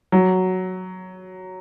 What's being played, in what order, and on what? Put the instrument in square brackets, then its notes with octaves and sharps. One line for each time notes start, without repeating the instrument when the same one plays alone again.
[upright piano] F#3